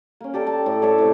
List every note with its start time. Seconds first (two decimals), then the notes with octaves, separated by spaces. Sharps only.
0.20 A#3 C#4
0.34 G4 A4 D5
0.47 A5
0.66 A2
0.82 A4 C#5 D5 E5
0.98 A2 C3 C5